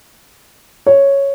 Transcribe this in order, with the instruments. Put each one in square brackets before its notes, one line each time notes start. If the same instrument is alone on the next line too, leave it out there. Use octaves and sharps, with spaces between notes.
[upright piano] C#5